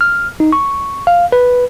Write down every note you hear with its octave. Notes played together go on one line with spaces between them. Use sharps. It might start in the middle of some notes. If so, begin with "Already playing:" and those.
F6
D#4
C#6
F5
B4